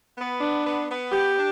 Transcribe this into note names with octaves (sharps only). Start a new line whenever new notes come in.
B3
D4
B3
B3
G4
D4